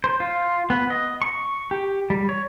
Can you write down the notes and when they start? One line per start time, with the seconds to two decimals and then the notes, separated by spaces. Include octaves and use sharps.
0.04 C5
0.20 F4
0.70 B3
0.90 D#5
1.22 C#6
1.71 G4
2.10 G3
2.29 C#5